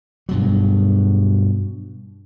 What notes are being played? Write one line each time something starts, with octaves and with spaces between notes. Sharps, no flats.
G2 B2 F#3